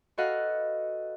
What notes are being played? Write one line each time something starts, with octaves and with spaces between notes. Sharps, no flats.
F#4 A4 B4 D#5 F5 F#5